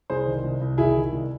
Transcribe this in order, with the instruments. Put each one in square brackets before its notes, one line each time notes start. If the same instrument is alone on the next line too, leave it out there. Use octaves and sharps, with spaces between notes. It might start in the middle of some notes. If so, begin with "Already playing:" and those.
[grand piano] C2 G#4 C5
D#3
C2
C2
D#3 E4 G#4
D#3
C2